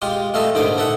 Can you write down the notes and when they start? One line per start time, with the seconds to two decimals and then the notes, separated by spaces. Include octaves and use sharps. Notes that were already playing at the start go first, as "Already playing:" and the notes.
0.02 G#3 F4 G4
0.34 A3 F4 A4 D#5 E5
0.55 D#2 G#2 D3 D#4 D5 D6
0.78 D#4 A4 E5 F#5